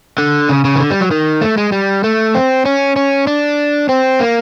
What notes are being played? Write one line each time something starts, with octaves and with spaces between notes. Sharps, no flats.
D3
C#3
C#3
D#3
D3
G3
F#3
D#3
A3
G#3
G3
A3
C4
C#4
C#4
D4
C4
A#3